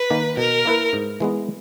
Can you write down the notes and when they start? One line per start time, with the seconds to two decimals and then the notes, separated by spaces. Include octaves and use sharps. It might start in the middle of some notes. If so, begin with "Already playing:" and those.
Already playing: B4
0.10 D#3 A#3
0.37 B2 A#4
0.65 A#3 E4 B4
0.93 G#2
1.20 E3 G#3 B3